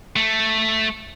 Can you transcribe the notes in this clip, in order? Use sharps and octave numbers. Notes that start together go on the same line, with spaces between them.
A3